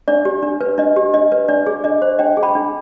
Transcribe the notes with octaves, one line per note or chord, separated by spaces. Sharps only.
D4 D5
G4
D4
B4
D4 D#5
G4
D4 D#5
B4
D4 D5
G#4
D4 D#5
C5
D4 D#5 G5
G#4
G5 B5
D4